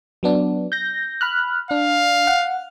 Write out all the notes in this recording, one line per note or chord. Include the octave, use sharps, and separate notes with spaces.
F#3 B3 D4
G6 A#6
B5 F6 F#6
D4 F5
F#5